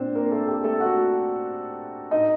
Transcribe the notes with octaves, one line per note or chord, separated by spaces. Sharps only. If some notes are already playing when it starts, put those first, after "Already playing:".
Already playing: A#2 C4 D4 C5 D5
A#3 A#4
A3 A4
G4
A3 A4
F#4 F#5
A2 D#4 D#5